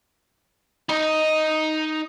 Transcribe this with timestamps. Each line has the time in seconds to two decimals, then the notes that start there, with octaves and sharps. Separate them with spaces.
0.89 D#4 D#5